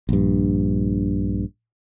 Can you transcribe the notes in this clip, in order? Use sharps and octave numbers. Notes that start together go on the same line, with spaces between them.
A#1 G2